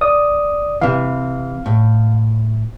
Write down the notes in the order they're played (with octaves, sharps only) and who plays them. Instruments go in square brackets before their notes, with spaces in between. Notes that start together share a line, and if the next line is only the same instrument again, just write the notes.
[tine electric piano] D5 D#6
[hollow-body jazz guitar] C3 E3 [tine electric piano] F5
[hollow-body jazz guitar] A2